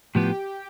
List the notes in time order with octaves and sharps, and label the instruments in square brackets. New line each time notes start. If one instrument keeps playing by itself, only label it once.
[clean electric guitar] A2 F3 B3 [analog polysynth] G4 G5